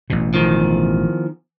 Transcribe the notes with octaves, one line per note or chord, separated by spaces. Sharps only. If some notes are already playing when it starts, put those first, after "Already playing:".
A1 B2
E2 D#3 F3